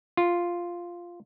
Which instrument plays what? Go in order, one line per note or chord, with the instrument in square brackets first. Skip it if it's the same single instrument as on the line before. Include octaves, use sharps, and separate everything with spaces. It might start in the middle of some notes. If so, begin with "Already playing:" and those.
[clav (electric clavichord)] F4